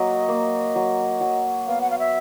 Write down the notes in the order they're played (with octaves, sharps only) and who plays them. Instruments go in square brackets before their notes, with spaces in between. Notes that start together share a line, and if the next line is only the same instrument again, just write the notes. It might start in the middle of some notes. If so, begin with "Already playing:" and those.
Already playing: [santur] F#3 A#3 [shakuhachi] D#5
[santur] A#3
F#3
F#3
[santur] B3 [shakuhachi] F5
[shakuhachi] F#5
F5
E5